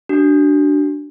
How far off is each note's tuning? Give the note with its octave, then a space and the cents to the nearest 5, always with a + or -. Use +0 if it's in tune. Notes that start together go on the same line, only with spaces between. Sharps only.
D4 +0 F#4 +35